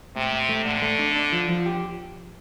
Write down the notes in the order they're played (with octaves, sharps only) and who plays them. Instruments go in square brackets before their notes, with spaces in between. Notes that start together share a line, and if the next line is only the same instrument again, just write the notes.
[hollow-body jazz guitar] A2 [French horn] C3
[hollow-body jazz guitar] A2
A3
[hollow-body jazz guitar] A2 [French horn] D3
[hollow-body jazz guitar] A3
D4
D4
F3
F3
G4